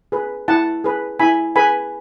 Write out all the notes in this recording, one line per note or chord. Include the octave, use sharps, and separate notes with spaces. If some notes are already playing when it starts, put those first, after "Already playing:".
G#4 B4
E4 F#5 A5
G#4 B4
E4 G#5 B5
G#4 B4 G#5 B5